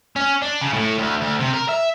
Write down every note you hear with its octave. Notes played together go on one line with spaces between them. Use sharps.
C#4
D4
C#3
A2
D2
D2
C3
A#4
E5